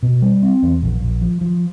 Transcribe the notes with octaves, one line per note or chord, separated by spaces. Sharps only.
B2
G3
C4
E2
A#1
A#1
F3
F3